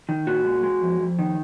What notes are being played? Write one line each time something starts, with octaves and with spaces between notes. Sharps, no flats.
D#3
A#2 F#4
G#3
G#3
F2
F2
D#3